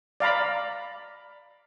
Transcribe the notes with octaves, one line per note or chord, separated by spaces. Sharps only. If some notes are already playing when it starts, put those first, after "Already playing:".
D5 F5 A#5 B5